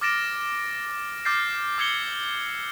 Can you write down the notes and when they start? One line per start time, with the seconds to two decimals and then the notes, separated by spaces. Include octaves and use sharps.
0.01 D6 F6 A6 A#6 D7 E7
1.25 D6 F6 G6 A6 C7
1.78 D6 E6 G#6 C7 C#7 G7